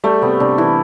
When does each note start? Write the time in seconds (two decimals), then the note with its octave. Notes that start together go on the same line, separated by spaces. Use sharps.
0.04 G3 A3
0.22 C3 B3
0.40 C3 D4
0.58 E3 E4